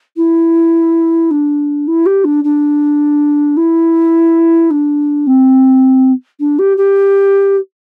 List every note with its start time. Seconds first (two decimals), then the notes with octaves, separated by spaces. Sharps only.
0.16 E4
1.30 D4
1.87 E4
2.05 G4
2.24 D4
2.44 D4
3.56 E4
4.70 D4
5.26 C4
6.40 D4
6.58 G4
6.77 G4